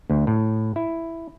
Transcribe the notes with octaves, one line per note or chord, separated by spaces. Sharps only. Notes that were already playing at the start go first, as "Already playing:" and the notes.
D2
A2
E4